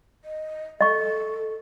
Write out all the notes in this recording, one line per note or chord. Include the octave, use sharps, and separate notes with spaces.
D#5
A4 D#5 C#6